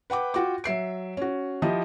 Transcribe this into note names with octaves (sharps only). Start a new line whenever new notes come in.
B4 F#5 G5 D6
F4 F#4 G5 D6
F#3 E5 C7 D7
C#4 F#4
F3 E4 G4 D#5